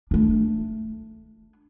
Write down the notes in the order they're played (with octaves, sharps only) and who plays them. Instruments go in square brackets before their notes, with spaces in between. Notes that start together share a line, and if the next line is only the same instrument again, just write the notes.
[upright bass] A3 D4